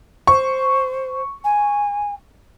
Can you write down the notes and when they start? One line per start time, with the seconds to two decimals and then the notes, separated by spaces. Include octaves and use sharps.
0.27 C5 C#6
1.44 G#5